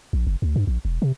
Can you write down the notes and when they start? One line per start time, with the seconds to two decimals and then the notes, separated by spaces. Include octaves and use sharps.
0.13 A#1
0.27 F#1
0.42 D2
0.56 G2
0.67 A#1
0.85 E1
1.02 C3